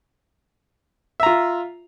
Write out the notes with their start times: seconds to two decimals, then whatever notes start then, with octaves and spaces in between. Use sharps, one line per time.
1.20 E5
1.23 A#5
1.26 F4